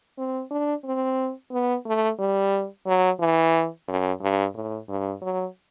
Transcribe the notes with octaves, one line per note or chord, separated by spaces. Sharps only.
C4
D4
C4
B3
A3
G3
F#3
E3
F#2
G2
A2
G2
F#3